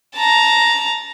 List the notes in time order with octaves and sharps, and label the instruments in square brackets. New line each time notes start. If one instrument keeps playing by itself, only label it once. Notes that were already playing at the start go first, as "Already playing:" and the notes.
[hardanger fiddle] A5 A#5